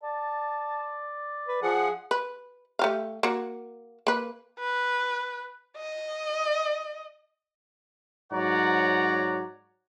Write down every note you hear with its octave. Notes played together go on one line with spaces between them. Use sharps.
D5 A5
B4
F3 G#4 F#5
B4
A3 G4 F5
A#3 F#4
A#3 B4
B4
D#5
G#2 F#3 C#5 D5 F#5 A#5